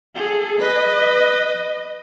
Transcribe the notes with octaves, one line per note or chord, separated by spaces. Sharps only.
G#4 A4
B4 D#5